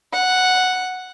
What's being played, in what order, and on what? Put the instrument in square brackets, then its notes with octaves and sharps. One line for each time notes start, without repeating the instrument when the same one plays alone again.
[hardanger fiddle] F#5